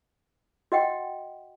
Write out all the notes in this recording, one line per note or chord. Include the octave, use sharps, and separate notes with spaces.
F#4 D#5 F#5 G5